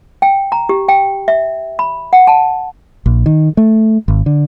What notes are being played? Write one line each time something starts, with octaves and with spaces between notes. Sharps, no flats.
G5
A#5
G4
G5
E5
B5
F#5
A5
A#1
D#3
A3
G#1
D3